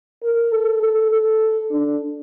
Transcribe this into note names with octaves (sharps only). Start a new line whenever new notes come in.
A#4
A4
A4
A4
D4